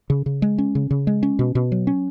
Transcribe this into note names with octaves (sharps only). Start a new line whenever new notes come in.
C#3
C#3
G#3
C#4
C#3
C#3
G#3
C#4
B2
B2
F#3
C#4